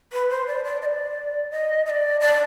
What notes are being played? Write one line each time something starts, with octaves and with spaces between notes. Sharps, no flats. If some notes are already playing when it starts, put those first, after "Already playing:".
B4
C5
D5
D5
D#5
D5
D#5
D#5
D5
D5